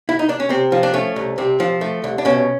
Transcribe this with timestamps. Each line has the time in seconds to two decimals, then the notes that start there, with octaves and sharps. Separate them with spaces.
0.09 E4
0.19 D#4
0.29 D4
0.40 C#4
0.50 C3 C4
0.72 F3
0.83 D4
0.94 A3 C#4
1.16 C2
1.38 C3 C4
1.60 F3
1.81 A3
2.04 C2
2.18 D4
2.25 B2 C#4